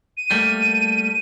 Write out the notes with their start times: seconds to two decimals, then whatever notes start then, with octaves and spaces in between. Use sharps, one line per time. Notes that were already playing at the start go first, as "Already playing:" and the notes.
0.17 D#7
0.31 G3 A3 A#3